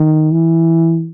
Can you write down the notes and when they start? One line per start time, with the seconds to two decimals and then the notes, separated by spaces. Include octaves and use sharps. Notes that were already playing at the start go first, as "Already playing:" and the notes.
Already playing: D#3
0.32 E3